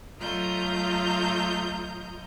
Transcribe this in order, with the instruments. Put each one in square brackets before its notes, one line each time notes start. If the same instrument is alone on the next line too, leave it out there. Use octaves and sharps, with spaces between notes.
[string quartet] F#3 A3 F4 D#5 A#5 G6